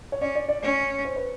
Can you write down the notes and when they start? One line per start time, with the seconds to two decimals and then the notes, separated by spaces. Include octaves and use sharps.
0.12 C#5
0.21 C#4 D5
0.35 D5
0.49 D5
0.63 C#4 C#5
1.05 C5
1.16 B4